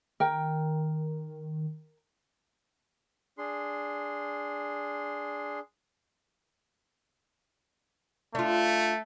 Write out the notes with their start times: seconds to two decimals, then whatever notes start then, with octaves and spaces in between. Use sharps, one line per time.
0.20 D#3 A#4 G5
3.38 D4 G#4 C6
8.35 A3 D4 F4